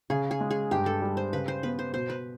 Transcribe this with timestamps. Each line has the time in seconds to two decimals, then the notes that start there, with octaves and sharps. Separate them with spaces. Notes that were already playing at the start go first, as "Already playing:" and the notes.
0.10 C#3 G#4
0.31 G#4
0.41 G#3
0.51 G#4
0.71 G2 G4
0.86 A4
1.02 G3
1.17 C5
1.33 C#3 B4
1.48 C5
1.63 B3 B4
1.79 C5
1.94 B2 C5
2.10 B4